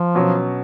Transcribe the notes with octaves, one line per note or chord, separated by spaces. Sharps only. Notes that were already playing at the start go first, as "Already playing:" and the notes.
Already playing: F3
B2 F#3 C#4